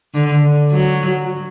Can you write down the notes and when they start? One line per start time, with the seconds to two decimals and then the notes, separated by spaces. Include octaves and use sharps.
0.14 D3
0.71 F#3